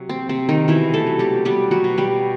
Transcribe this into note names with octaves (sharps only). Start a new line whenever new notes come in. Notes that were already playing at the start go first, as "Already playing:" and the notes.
Already playing: C3 F#3
C4
C3 C4
D#3 D#4
B2 E3 E4
A3 A4
F#3
G3 G4
G3 B3 G4
F#3 F#4
B2
G3 G4